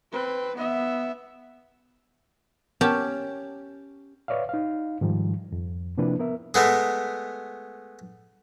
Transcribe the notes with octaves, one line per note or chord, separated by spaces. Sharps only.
C4 B4
B3 E5
B3 C#4 G4 A#4 A5
B4 C#5 D5 E5 F5
D#4 F5
G#2 D#3 F3 G3
F2
C3 F3 A#3 D4 E4 B4
B3 A#4 E5
G#3 A3 B3 G#4